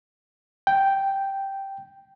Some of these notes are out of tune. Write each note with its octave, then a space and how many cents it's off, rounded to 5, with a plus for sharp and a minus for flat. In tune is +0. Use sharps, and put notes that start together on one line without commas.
G5 -5